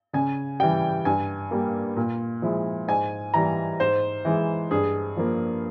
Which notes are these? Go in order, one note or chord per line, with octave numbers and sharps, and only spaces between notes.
C#3 G#5
E3 G3 G5
G2 G#5
G3 A#3
A#2
F3 G#3 E4
G#2 G#5
E3 G3 A#5
G#2 C5
E3 G#3 E4
G2 G#4
F3 A#3